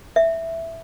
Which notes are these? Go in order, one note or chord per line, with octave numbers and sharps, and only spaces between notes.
E5